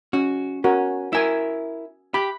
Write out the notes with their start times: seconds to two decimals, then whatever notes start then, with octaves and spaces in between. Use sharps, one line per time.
0.13 C#4 F#4
0.64 C#4 F#4 A#4
1.13 E4 A#4 G#5 E6
2.14 G4 B5